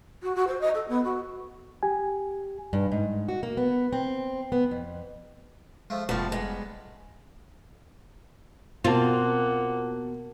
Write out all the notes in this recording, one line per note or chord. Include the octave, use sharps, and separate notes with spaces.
F#4
F#4
C5
D#5
A4
B3
F#4
G4 G#5
G2
G#2
F#4
A#3
B3
C4
B3
F2
F3 G#3 A3 F4
F1 G#2 B2 F3 G3 A3 F5
G#3 B3
B2 A#3 C4 F4 F#5 A5